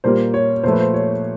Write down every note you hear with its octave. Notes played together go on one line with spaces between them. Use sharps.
A#2 G3 A#3 C5
C#5
A#2 F3 A3 C5
B4
C5
C#5